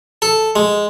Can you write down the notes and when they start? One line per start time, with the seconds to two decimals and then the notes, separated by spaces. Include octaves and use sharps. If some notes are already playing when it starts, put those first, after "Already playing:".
0.22 A4
0.56 G#3